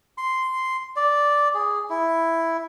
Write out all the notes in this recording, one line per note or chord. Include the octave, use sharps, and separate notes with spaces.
C6
D5
G#4
E4